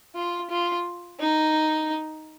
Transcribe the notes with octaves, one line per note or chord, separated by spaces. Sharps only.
F4
F4
D#4